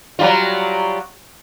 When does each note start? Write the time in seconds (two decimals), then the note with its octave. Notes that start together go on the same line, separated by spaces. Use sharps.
0.19 F#3 G3 F4